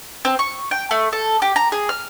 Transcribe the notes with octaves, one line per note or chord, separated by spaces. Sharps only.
C4
C#6
G5
A3
A4
G4
A#5
G#4
F6